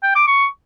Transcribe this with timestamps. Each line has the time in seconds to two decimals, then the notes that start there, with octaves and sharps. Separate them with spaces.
0.03 G5
0.15 D6
0.27 C#6